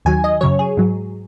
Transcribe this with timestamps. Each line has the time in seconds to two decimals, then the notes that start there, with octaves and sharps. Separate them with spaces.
0.05 D#2 D#3 F#3 G#5
0.24 D#5
0.41 F#2 C#3 F#3 C#5
0.59 G#4
0.77 G#2 F#3